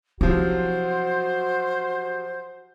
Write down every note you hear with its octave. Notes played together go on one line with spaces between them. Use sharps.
C3 F3 F#3 E4 F#4 C5